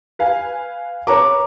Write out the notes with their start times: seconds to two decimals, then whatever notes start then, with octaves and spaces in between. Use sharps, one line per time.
0.19 B4 F5 G#5
1.07 A#4 B4 C#5 A#5 D6